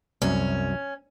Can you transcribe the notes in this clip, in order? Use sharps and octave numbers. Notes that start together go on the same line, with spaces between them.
C2 F#2 C#4